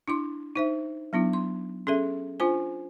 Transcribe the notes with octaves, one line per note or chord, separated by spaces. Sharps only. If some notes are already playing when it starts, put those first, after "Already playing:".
D4 E4 C6
D#4 C5 E5
F#3 B3 D4 E4
C6
C#4 G#4 A4 E5
D4 F4 C5 G#5